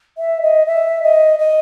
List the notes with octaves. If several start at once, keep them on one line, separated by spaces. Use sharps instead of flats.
E5
D#5
E5
D#5
D#5